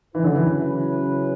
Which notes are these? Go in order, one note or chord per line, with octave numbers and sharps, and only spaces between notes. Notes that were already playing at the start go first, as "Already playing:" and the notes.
C#3 E3 F#3 C#4 E4 B4
D3
E3